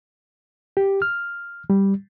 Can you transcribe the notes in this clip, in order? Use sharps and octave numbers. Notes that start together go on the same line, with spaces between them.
G4
F6
G3